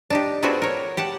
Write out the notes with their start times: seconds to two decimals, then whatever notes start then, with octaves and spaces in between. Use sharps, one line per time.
0.10 D4 D#4 G4
0.43 B3 C4 D4 F4 F#4 G#4
0.62 A#4 C#5
0.97 G4 F#5 A5